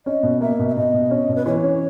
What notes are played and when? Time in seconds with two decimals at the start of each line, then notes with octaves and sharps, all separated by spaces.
0.06 C#4 D#5
0.23 B2
0.41 A#3 E5
0.59 B2
0.68 E5
0.76 B2 D#5
0.93 B2
1.11 C#4
1.29 B2
1.36 B4
1.46 E3 C#5
1.63 C#4